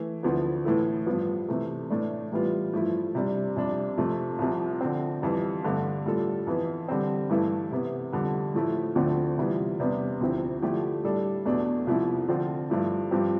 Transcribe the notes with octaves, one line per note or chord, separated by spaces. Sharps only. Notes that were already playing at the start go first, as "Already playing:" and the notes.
Already playing: E3 A3
D2 D3 F3 B3 E4
A2 E3 B3 E4 A4
G2 F3 B3
C3 E3 A3
A2 E3 A3 D4
A2 E3 G3 B3 F4
G2 F3 A3 E4
C3 G3 D4
F2 C3 G3 D4
F2 C3 F3 A3
C2 C3 F3
D3 F3 C4
F2 E3 G3
G2 D3 A3
A2 G3 D4 F4 A4
F2 E3 B3
D3 G3 C4
G2 E3 A3 E4 A4
C3 E3 B3
F2 D3 G3
A2 F3 A3 E4
D2 D3 F3 A3 C4
C3 E3 G3 B3 F4
E2 C3 G3 B3 D4
D2 C3 F3 C4 E4
D3 F3 A3 E4 G4
A2 G3 D4 A4
E2 B2 A3 D4
C2 C3 F3 A3 E4
D3 F3 C4 F4
G2 F3 A3 E4
G2 F3 C4 G4